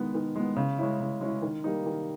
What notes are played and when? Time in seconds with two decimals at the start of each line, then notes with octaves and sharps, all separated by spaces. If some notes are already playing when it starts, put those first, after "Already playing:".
Already playing: D#3 G#3 B3
0.14 D#3
0.36 G#3 B3
0.56 C#3
0.78 G#3 C#4 E4
1.00 C#3
1.21 G#3 C#4 E4
1.42 D#3
1.64 G3 A#3 D#4
1.86 D#3